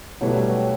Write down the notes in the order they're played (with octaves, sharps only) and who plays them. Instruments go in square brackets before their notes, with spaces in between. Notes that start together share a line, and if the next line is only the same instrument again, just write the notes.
[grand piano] B2 A3 E4 G4 B4 [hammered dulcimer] F#3
[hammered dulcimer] G3
F#3